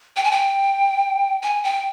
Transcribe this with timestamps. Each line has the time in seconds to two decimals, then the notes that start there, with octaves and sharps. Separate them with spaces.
0.16 G5
0.24 G#5
0.32 G5
1.43 G#5
1.64 G5